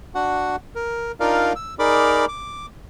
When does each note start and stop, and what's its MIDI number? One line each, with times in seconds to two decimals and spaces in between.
0.15 0.56 62
0.15 0.56 66
0.15 0.56 78
0.75 1.12 70
1.20 1.53 62
1.20 1.53 63
1.20 1.53 65
1.20 1.53 70
1.20 1.53 74
1.20 1.53 77
1.56 1.75 88
1.79 2.25 63
1.79 2.25 68
1.79 2.25 70
1.79 2.25 74
1.79 2.25 83
1.79 2.25 86
2.28 2.66 86